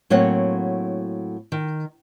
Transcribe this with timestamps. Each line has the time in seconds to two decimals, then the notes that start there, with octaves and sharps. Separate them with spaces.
0.10 A2 F#3 A#3 C4 C#5 F#5
1.52 D#3